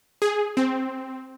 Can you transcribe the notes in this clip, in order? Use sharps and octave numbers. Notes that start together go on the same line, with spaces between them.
G#4
C4